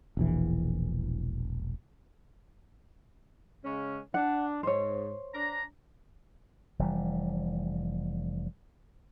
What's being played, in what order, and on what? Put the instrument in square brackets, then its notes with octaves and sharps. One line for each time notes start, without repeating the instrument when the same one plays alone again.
[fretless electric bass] E1 A#1 E3
[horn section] C#3 G#3 C#4
[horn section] D4 [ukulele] F#5
[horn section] G#2 [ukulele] C5 C#5
[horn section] D4 A#5
[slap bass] F1 E3 G3